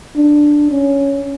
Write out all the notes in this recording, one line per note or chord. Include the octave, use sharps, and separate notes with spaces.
D4
C#4